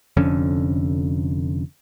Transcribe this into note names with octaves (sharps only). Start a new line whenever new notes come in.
F1 F2 D3 C#4